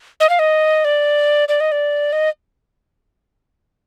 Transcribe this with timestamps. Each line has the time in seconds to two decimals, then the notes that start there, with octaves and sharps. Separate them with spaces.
0.20 D#5
0.29 F5
0.39 D#5
0.85 D5
1.49 D5
1.60 D#5
1.72 D5
2.13 D#5